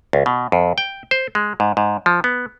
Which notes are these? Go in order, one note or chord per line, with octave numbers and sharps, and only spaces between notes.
C#2
B2
F2
G5
C5
G#3
G#2
G#2
F3
B3